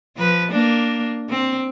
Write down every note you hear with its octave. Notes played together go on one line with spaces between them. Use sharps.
F3 B4
A#3 D4
C4